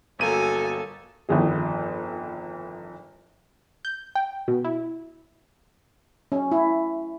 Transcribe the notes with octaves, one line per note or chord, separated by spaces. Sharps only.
G1 F#3 A#3 A4 G#5 D#7
G1 C2 F2 D#3 G#4
G6
G5
B2
E4
C#4
E4